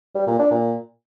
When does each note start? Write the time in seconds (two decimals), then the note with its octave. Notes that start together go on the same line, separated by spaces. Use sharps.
0.15 G3
0.27 A#2
0.39 D4
0.51 A#2